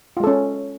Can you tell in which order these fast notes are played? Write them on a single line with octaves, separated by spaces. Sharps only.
F4 G#3 A4 C#4